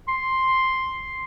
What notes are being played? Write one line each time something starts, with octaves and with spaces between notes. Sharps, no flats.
C6